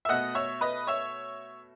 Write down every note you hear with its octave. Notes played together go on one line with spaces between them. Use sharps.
E5
B2 A3 D#5 F#5
C#5 E5
B4 D#5
C#5 E5